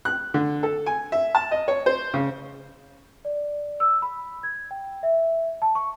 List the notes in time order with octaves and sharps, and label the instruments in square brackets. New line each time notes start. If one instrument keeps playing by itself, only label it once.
[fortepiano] F#6
D3
A4
G#5
E5
A5
D#5
C#5
C5
C#3
[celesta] D5
E6
B5
G#6
G5
E5
A5
C#6